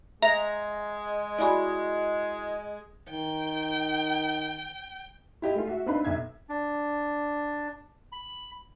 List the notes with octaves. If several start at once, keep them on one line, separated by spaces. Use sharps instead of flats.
G#3 E5 A#5
E4 F#4 D5 G#5 B5
D#3 G5
E4 G4 D#5
G#3 A3 F4
F#4 E5
C4 D4 D#4 B4 F5 B5
B1 E5 G#6
D4
B5